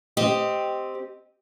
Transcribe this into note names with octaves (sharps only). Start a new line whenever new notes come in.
C4 G4 D#5